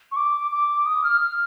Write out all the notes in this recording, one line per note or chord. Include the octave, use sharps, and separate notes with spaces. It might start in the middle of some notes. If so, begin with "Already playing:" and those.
C#6
D6
D6
D#6
F6
F6